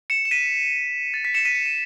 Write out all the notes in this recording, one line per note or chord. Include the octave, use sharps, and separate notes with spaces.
C#7 E7
E7
B6 D#7
A6
B6
C#7 E7
B6 D#7
C#7
D#7